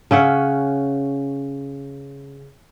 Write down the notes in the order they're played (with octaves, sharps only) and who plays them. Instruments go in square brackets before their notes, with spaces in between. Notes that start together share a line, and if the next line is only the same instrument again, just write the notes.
[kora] C#3 C#4 E5 F#5